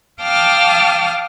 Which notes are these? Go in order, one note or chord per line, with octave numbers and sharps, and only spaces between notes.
F5 G5 A5 D6 D#6 F6